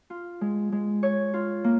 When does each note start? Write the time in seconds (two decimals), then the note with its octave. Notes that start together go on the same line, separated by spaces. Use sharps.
0.10 F4
0.41 G#3
0.72 G#3
1.03 C#5
1.34 F4
1.64 A#3